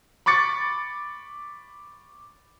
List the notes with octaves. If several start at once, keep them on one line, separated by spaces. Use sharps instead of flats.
B5 C#6 D6 A6 C#7